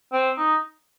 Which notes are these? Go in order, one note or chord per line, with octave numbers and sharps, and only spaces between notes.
C4
D#4